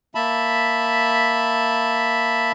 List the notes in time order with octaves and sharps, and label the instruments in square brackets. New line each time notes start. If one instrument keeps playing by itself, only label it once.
[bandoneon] A#3 E5 A5 B5